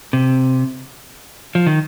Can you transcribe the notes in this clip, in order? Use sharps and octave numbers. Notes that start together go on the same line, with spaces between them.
C3
F3
D#3